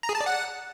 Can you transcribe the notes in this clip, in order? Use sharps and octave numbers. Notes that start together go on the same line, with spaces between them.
A#5
G#4
A5
D5
F#5